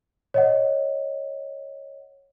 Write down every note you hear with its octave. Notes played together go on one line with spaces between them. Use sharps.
C#5 D#5 F#5